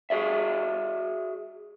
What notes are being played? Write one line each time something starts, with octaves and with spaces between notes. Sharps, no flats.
F#4 G#4 D5 E5